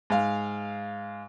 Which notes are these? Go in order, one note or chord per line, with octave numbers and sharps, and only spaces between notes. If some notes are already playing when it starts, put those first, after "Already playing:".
G#2 F5